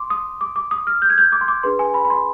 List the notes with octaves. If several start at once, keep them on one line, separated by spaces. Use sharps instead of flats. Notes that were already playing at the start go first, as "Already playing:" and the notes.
Already playing: C6 D6
D#6
D6
D6
D#6
F6
G6
G#6
G6
D6
C6
D6
D4 G#4 B4 C6
G#5
B5
B5
C6